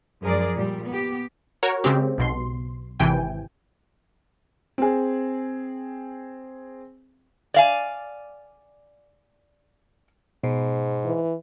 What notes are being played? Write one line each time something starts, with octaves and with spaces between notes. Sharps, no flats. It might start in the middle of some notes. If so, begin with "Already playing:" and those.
F#2 F3 G#3 G#4 A#4 D5
A#2 G3
B3 G4
F#4 A#4 C#5
C#3 G#3 C4 G4
B1 B2 C6
G#1 C3 E3 G5 G#5
C4 G#4
D5 F5 G#5
G#2 B2
E3